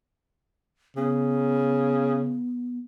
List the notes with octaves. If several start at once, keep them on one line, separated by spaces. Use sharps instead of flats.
C#3 B3